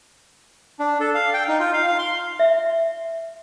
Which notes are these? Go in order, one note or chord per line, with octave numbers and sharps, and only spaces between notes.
D4
A4
F5
G5
D#4
F4
F5
F5
C6
E5